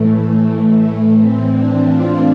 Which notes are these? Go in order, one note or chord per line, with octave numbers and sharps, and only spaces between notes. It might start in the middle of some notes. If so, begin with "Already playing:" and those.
Already playing: A2 E3 A3
A3
A2 E3 C4
D4
F4